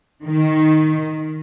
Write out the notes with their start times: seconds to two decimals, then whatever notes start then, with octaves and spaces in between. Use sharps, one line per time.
0.24 D#3